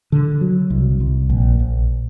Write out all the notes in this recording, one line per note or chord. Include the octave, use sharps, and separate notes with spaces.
D3
F#3
C2
C2
A#1
A#1